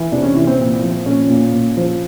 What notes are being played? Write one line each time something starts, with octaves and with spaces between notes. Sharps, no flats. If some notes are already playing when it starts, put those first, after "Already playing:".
Already playing: E3
C3 D4
C#4
E3
C4
A#2
F3
A#2 C#4
A#2
A#2
F3